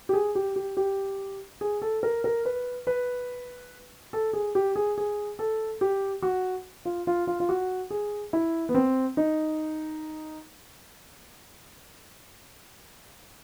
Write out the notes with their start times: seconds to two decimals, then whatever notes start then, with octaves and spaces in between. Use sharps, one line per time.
0.09 G4
0.13 G#4
0.35 G4
0.56 G4
0.77 G4
1.61 G#4
1.82 A4
2.03 A#4
2.24 A#4
2.45 B4
2.87 B4
4.13 A4
4.33 G#4
4.55 G4
4.76 G#4
4.98 G#4
5.39 A4
5.81 G4
6.22 F#4
6.85 F4
7.07 F4
7.27 F4
7.40 F4
7.49 F#4
7.90 G#4
8.33 E4
8.69 B3
8.75 C4
9.17 D#4